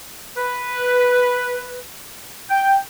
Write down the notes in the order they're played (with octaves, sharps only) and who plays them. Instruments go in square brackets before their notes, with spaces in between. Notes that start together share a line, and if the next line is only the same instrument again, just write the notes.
[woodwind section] B4
G5